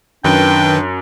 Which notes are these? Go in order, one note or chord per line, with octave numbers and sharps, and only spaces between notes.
F#2 D#3 D4 B4 G5